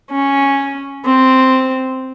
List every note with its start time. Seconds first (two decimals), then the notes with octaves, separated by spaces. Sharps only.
0.11 C#4
1.05 C4